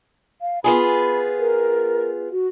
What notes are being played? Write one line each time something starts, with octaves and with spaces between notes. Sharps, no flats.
F5
B3 F4 G#4 B5
A#4
F#4